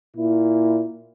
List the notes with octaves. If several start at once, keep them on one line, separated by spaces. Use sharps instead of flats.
A#2 E4